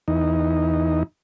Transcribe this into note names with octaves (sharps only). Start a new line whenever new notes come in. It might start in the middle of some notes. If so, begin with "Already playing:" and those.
E2 D#4